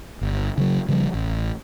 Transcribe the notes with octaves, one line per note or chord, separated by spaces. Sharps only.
G1
C#3 F#3
C#3 F3 G3
A1